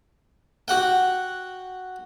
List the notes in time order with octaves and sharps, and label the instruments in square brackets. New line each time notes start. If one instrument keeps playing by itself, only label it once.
[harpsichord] F#4 F#5 G5